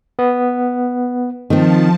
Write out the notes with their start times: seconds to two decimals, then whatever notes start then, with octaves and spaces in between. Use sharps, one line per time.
0.19 B3
1.50 D#3 F3 C4 A5